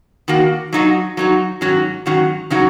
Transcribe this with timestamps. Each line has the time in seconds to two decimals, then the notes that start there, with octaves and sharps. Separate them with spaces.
0.28 D#3 A#3 F#4
0.73 F#3 D#4 F#4
1.17 F#3 D#4 F#4
1.61 G#2 D#3 F#3 C#4 F#4
2.06 G#2 D#3 F#3 C#4 F#4
2.50 C#3 F#3 D#4 F#4